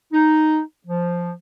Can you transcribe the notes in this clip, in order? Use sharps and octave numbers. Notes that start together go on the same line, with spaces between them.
D#4
F3